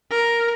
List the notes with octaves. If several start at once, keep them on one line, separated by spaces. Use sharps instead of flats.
A#4